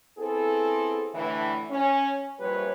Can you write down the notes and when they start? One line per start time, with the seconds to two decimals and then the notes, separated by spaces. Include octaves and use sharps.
0.18 B3 C4 E4 G#4 A4
1.15 A2 D3 E3
1.71 C#4
2.40 F#2 A#2 F3 G3 B4 C#5